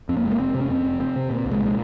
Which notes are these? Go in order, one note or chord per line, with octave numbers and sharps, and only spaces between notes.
F2 C4
A#3
F1 G#3
A#3
F1 C4
C3
C#4
F2 C4
F1
F1 C4
C3
A#2
C2
G#3
A#2
G#3